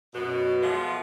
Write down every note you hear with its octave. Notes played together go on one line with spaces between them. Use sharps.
F#2 B2
F3 G#3 A3 B3 F4